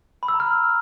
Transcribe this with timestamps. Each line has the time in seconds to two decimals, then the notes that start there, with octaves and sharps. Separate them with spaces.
0.23 B5
0.28 E6
0.34 A#5
0.40 F6